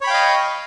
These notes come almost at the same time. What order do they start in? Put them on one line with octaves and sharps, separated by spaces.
C#5 B5 G5 F5 D#5